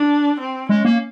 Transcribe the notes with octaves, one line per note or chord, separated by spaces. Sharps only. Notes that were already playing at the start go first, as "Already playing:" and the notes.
Already playing: D4
C4
G#3 C#4
A#3